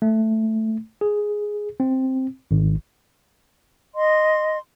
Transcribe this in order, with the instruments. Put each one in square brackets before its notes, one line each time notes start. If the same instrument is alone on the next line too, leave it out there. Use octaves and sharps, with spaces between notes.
[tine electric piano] A3
G#4
C4
G#1
[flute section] D#5 C6